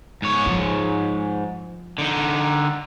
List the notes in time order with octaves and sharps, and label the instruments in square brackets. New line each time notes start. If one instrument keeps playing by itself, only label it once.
[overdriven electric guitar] G#2 C#5
[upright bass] F3
[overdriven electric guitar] D3 D#4